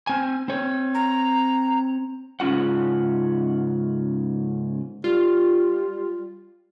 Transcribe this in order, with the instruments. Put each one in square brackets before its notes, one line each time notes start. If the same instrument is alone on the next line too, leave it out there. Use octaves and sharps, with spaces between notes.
[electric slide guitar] C4 G#5
C4 C#5
[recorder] A#5
[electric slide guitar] G#2 C#3 C#4 F4 F#5
[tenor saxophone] G3 [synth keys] F4